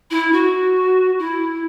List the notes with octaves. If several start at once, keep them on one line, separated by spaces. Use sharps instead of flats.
E4
F#4
E4